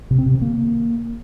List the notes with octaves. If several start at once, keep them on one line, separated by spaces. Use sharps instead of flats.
C3
C4
C3
D#3
A#3